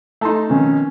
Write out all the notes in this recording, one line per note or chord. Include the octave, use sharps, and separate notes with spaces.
A3 D#4 A5 A#5 C6
F2 B2 D#3 C#4